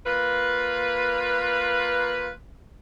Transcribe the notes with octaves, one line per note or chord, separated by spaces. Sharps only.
A#3 F4 B4